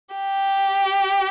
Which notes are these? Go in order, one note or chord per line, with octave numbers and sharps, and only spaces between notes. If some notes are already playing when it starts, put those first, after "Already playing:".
G4